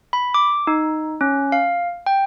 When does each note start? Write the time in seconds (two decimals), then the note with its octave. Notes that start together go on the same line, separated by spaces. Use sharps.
0.13 B5
0.34 D6
0.67 D#4
1.21 C#4
1.52 F5
2.06 G5